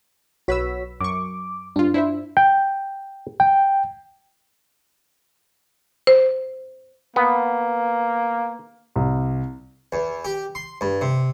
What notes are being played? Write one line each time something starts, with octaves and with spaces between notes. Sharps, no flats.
B1 F#4 B4 C#5 E6 B6
F#2 C#6 D6
G2 D4 F4
D4 E4 C5 E5
G5
G5
C5
A#3 B3
C2
E2
G4
C6
G2
C3